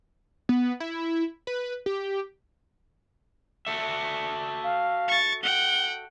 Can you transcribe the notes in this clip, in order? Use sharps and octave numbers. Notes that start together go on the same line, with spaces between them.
B3
E4
B4
G4
F#4 A4 E5 C#7
F5
C#6 A6
F#5 G5 G7